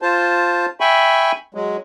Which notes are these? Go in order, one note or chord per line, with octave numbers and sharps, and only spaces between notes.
F4 C5 A5
E5 G5 G#5 B5 C#6
F#3 G#3